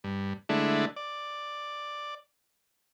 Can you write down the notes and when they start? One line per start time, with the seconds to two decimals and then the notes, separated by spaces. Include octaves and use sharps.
0.04 G2
0.49 D3 G#3 A3 D4 E4
0.96 D5